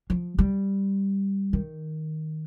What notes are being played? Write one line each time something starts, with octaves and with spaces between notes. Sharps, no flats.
F3
G3
D#3